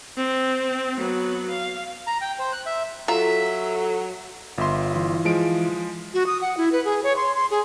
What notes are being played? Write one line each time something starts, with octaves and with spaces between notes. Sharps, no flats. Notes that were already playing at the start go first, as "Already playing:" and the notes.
C4
F#3 B3
F5
A#5
G5
C5
F#6
E5
F#3 F4 A4 E5 A#5
G1 F4 E5 C6
E3 F4
F3 G#3 D7
F#4
D#6
F#5
E4
B4
G#4
C#5
C6
C6
G#4